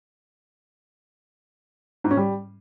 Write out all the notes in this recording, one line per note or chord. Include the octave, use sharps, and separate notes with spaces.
G#2
C#4
G3